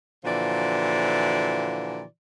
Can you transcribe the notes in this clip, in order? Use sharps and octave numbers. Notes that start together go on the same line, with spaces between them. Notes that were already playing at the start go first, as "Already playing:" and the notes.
A#2 D3 E3 F3 F#4 D5